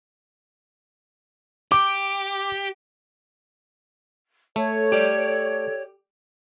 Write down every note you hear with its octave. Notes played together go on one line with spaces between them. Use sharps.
G4 D6
A3 A4 C#5
G4 D5